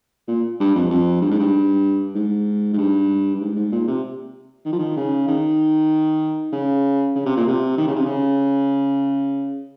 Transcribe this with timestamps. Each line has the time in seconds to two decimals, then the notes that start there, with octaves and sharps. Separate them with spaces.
0.28 A#2
0.60 G2
0.75 F2
0.90 F2
1.21 G2
1.31 G#2
1.39 G2
2.15 G#2
2.73 G#2
2.78 G2
3.34 G2
3.41 G#2
3.56 G#2
3.72 A#2
3.88 C3
4.65 D#3
4.72 F3
4.79 D#3
4.97 C#3
5.28 D#3
6.52 C#3
7.15 C#3
7.26 C3
7.37 A#2
7.47 C3
7.78 D#3
7.87 C#3
7.96 C3
8.06 C#3